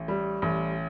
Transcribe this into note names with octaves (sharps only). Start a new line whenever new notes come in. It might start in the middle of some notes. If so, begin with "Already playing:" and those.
Already playing: A1
G3
A1